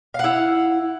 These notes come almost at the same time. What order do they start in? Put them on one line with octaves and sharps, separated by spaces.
F5 F#5 E4